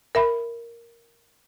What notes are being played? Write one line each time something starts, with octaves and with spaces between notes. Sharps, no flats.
A#4 E5 B5